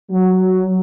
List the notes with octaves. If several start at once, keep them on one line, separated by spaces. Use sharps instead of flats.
F#3